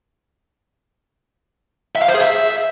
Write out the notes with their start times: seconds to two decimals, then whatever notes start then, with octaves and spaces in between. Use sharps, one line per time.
1.96 E5
2.02 F5
2.08 C5
2.14 G#4
2.21 E5